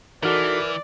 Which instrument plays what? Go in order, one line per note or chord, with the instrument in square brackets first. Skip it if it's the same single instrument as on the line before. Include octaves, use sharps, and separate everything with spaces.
[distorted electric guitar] E3 [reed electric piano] D#4 F#4 A4 [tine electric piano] A#4 F6 [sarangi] D5